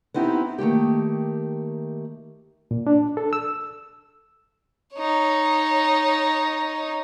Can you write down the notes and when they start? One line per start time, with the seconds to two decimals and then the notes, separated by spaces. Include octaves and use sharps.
0.14 B3 C4 D#4 E4 G4
0.58 D#3 A3 A#3 G4
2.71 A#2
2.87 D4
3.17 A4
3.33 E6
4.95 D#4 C#5